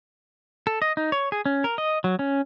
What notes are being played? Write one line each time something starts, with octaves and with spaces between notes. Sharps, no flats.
A4
D#5
D#4
C#5
G#4
C#4
A#4
D#5
F#3
C#4